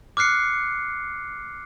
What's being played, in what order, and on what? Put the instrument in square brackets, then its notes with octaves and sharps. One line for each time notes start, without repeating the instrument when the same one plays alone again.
[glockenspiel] D6 F6 F#6 C7 C#7